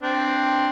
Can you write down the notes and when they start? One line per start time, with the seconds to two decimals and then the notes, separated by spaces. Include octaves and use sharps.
0.02 C4 D4